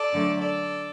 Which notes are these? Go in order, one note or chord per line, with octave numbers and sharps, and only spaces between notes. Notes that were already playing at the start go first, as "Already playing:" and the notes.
Already playing: A4 D5
F#2 D3 A3
A4 D5